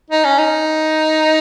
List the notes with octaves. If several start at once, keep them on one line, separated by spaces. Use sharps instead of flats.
D#4
C#4
D#4